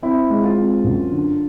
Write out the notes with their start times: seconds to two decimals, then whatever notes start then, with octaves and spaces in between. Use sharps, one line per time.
0.03 C4 E4
0.30 G#3
0.43 F4
0.57 C4
0.84 F#2
1.11 D3